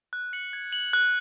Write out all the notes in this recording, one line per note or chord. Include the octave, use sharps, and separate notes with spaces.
F#6
C#7 F#7
G#6
F#7
F#6